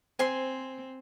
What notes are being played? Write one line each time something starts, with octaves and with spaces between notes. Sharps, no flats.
C4 C5 G#5 C6